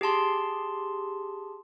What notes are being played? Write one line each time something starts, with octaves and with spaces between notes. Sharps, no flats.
G4 G#4 A5 C6